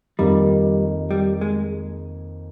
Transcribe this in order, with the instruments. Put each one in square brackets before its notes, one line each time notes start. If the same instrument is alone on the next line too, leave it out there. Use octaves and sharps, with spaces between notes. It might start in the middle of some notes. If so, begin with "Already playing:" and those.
[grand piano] F2 D#3 A#3 D#4 [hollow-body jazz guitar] G3
[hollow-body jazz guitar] G3
G#3